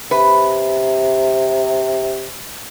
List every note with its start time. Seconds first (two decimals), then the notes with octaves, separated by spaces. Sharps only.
0.11 C3 B4